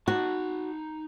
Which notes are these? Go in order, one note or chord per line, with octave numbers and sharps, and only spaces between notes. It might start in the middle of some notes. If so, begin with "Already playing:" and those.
D#4 F#4 A5